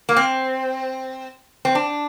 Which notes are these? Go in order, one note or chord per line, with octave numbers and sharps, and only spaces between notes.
A#3
C4
C4
D4